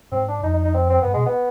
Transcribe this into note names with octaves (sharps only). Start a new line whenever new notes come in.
G#2 C4
D4
F2 D#4
D#4
D#4
C4
C4
G2 B3
B2 G#3
B3